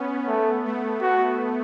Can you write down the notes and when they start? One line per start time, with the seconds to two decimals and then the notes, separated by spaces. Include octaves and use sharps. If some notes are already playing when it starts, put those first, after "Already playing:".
Already playing: B3 C#4
0.27 A3
0.65 A3
1.02 F#4